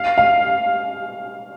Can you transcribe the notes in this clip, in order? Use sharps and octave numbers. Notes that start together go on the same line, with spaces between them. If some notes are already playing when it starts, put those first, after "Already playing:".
Already playing: F5
F5